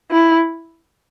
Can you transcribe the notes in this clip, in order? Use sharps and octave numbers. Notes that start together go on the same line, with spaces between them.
E4